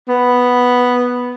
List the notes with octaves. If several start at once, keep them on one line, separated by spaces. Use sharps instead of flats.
B3